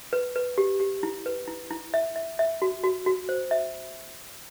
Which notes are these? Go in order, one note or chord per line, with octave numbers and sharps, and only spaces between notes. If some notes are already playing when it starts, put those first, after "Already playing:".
B4
B4
G4
G4
E4
B4
E4
E4
E5
E5
E5
F#4
F#4
F#4
C5
E5